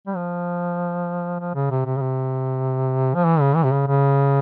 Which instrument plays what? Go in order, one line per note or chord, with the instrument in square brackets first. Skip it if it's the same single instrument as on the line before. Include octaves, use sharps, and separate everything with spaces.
[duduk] G3
F3
F3
C#3
C3
C3
C#3
C3
F3
E3
C#3
E3
C3
C#3
C#3